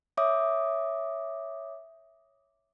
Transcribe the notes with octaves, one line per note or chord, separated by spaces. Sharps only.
C#5 E5 D6 D#6